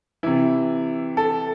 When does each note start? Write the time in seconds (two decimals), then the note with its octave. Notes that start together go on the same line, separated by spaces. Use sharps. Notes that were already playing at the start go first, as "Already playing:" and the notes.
0.23 C3 E3 E4
1.17 A4